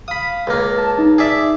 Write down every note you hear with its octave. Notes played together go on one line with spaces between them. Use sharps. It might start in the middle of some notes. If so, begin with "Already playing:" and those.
F5 B5 D#6
C#2 A#3
A5
D#4
G#4 D5 E5